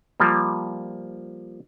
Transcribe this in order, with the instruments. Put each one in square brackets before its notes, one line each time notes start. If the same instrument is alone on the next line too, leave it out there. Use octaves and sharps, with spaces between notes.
[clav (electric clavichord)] F3 G3 A#3